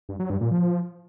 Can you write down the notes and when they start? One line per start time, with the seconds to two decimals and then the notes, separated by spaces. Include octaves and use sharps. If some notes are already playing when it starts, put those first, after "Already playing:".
0.09 G2
0.19 F#3
0.30 G2
0.41 A#2
0.51 F3